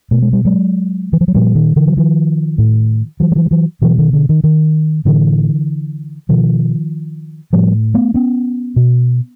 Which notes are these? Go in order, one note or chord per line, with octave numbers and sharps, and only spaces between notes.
B2 A3
G#3
G3
F#3 G#3
E3
F3
F#3
A#2 F3 G3
D#3
D3 E3
F#3
D#3 F3
A2
E3 F#3
G3
E3 F#3
G3
E3 F#3
B2 E3 F#3
D#3
D3
D#3
D#3
A2 D3 E3
B2 D#3 F3
A2 F3 G3
A3 B3
B3 C#4
B2